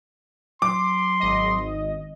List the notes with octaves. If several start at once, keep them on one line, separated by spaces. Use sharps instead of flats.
F#3 C6 D6
G#1 D#5